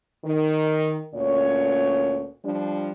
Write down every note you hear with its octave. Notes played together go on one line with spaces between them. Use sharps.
D#3
D2 A#2 C#4 C#5
F3 G3 D4